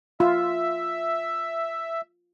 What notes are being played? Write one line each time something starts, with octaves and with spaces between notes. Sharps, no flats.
F4 E5